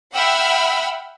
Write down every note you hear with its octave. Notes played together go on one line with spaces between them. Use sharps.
E5 F#5 G5 B5 E6 F6